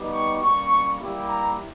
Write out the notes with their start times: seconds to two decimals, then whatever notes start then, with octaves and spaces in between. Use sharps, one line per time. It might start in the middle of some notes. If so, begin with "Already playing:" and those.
Already playing: G3 B3 D#4 G4
0.11 C#6
0.40 G3 A#3 C#4 C#6
1.00 G3 A#3 E4 G4
1.30 A#5